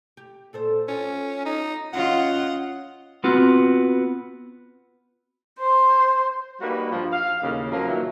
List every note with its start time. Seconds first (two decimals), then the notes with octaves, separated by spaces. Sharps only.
0.17 G4
0.53 A#2 A4 C5
0.88 C#4 F4
1.45 D#4
1.93 C#4 F4 D#5 F5 F#5
3.24 B3 C4 F4 F#4
5.59 C5
6.61 G3 A#3 D#4 F#4 B4
6.92 G2 F3
7.13 F5
7.42 D#2 A2 C#3
7.72 F3 F#3 A#3
7.88 A#2 D#3 E3 F#3